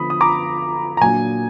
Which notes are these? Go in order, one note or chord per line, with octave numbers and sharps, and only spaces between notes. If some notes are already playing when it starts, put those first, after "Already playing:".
Already playing: D3 F3 B3 B5 D#6
D#6
A#5 D6
A#5
A#2 F#3 A#3 D4 G#5